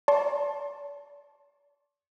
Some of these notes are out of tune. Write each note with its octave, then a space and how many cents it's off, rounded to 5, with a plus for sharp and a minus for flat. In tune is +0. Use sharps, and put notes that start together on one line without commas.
D5 -40 A5 -10 C6 +30